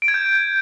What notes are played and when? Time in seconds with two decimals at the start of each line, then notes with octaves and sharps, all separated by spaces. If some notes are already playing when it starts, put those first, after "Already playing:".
0.02 D7
0.08 G#6
0.14 G6